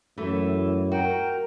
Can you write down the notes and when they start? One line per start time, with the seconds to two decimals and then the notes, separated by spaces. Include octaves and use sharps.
0.18 F#2 E3 A3
0.92 F#4 A#4 G5